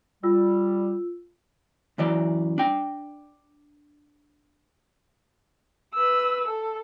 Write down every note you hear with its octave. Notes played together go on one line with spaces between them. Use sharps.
G3 F4 E6
F#2 E3 D5
D4 G5
B4 E6
A4